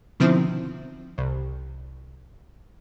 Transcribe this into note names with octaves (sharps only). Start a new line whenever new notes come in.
B2 D3 D#3 F3 C4 E4
C2